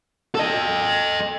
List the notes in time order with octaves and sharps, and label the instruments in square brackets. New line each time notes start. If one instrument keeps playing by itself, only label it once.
[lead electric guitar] A4 D#5